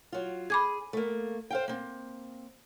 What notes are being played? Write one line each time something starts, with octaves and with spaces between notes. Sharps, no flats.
F#3 F4
G#4 B5 D6 G#6
A3 A#3
C5 F5 G5
A#3 C4